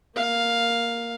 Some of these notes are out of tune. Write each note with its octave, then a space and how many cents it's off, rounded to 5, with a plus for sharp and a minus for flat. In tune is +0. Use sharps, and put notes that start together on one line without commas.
A#3 +0 F5 +5